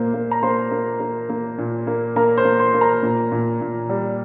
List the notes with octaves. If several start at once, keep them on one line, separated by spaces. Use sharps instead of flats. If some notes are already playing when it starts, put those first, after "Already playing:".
Already playing: A#2 A#3 C5
A#3
A#5
A#3 C5 C6
A#3
A#3
A#3
A#2
A#3
A#3 A#4 A#5
C5 C6
A#3
C5 C6
A#3
A#4 A#5
A#2
A#2
A#2
G3